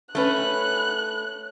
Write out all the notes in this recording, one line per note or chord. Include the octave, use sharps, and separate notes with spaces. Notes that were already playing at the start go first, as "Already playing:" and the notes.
A3 C#4 B4 F#6